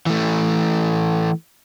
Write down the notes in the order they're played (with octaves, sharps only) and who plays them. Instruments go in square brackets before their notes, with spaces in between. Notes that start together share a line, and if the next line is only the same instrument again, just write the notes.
[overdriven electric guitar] E3 A3